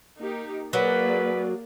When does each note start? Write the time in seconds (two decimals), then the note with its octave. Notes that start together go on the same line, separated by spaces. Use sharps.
0.17 A#3 D#4 G4
0.73 F#3 A#3 G#4 B4 D5